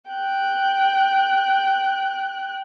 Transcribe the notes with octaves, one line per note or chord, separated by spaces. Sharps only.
G5 F#6